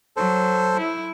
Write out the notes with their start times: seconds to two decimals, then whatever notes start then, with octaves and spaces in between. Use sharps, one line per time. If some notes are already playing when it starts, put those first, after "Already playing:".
0.17 F#3 A4 C5
0.77 E4